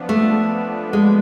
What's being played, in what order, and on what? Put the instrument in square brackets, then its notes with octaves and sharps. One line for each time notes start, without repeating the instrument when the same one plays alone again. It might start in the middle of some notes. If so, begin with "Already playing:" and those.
Already playing: [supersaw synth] F3 B3 D4
[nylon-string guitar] A3
G#3